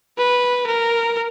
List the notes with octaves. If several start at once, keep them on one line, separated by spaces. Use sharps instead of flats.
B4
A#4